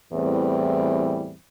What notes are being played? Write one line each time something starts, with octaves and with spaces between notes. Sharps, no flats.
E2 A2 E3 G3 C4